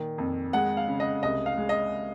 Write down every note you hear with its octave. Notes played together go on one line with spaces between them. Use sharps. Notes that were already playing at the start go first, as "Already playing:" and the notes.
Already playing: A#2 D#3
F2
G#3 F#5
F5
C#3
D#5
C2 D#5
F5
G#3
D#5